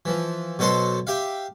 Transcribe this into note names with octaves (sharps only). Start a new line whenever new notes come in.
E3 F3
B2 F#3 A4 C5 C6
G4 E5 F5